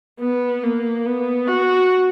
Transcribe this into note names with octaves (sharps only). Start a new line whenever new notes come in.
B3
A#3
B3
F#4